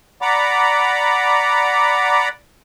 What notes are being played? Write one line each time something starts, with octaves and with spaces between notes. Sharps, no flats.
D5 F#5 A#5 B5 D6